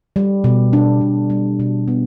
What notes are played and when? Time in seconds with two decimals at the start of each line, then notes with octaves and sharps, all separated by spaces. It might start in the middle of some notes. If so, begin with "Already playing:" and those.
0.16 G3
0.44 B2
0.73 D4
1.01 B2
1.30 G3
1.60 B2
1.88 B3